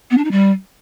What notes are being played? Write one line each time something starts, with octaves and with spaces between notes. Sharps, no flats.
B3
D4
D#4
G3